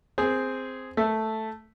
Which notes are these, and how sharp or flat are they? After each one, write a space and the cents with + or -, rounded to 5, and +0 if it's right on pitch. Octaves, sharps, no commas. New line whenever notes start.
C4 -5 G#4 +0
A3 +0 E5 +0